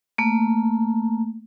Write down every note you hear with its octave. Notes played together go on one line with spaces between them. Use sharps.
A3 A#3